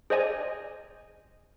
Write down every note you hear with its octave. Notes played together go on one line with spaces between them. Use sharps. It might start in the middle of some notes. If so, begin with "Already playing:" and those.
G#4 C5 D5 D#5 G#5